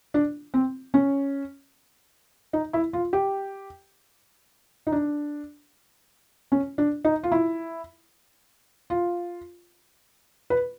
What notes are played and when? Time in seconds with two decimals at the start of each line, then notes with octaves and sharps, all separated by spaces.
0.14 D4
0.54 C4
0.94 C#4
2.53 D#4
2.73 E4
2.93 F4
3.13 G4
4.87 D#4
4.92 D4
6.52 C#4
6.78 D4
7.05 D#4
7.23 F4
7.32 E4
8.90 F4
10.50 B4